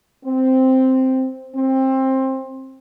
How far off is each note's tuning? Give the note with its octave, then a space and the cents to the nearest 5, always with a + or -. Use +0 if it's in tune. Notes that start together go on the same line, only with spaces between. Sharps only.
C4 -5
C4 +20